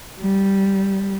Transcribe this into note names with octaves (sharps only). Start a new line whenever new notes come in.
G3